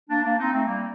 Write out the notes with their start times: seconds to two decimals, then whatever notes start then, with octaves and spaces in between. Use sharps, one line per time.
0.09 A#3 D4
0.23 A#3 D4
0.38 C4 D#4
0.53 A3 C4
0.67 G3 A#3